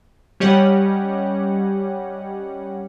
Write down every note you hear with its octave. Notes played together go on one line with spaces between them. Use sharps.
G3 C#4 G4 C#5 D#5 F#5